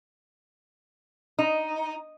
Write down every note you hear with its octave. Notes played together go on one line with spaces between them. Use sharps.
D#4